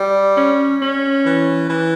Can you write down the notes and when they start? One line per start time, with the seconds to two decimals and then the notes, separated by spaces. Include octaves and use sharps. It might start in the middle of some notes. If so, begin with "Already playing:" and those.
Already playing: G3
0.37 C#4
0.81 C#4
1.25 E3
1.69 E3